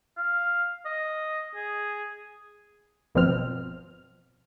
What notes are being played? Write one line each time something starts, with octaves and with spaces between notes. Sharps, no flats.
F5
D#5
G#4
G1 B2 F3 C4 F6